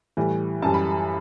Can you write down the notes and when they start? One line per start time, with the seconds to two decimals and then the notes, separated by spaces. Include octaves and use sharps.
0.17 A2 E3 G3
0.62 F#2 E3 G3 A5
0.74 B5